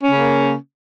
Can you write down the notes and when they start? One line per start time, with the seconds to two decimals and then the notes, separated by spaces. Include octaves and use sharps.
0.04 C#4
0.08 C#3
0.13 A#3